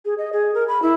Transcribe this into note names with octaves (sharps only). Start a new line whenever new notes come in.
G#4
D#5
G#4
A#4
B5
E4